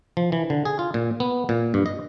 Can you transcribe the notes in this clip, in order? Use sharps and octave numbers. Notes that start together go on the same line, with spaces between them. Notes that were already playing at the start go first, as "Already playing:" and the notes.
F3
E3
D3
G#4
F4
A#2
B3
A#2
G2
D#5